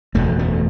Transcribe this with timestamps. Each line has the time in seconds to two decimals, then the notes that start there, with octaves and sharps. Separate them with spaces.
0.15 F#1 E2 B2 A3
0.39 A3